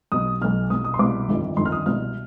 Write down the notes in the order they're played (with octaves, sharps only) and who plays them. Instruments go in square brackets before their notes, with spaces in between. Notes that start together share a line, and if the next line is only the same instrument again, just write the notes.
[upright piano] B1 B2 D#6
B1 B2 F6
C2 B2 D#6
D#6
C6
C2 B2 D6
G1 F2 D#3
G1 F2 D#3 C6
F6
D#6
C2 B2 F6